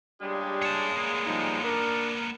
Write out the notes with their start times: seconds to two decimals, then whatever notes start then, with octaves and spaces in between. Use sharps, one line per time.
0.21 A#2 C#3 G3 G#3 D4 G4
0.62 C#5 A5
0.97 A#3 B3
1.27 F3 G3 D#4
1.64 D4 A#4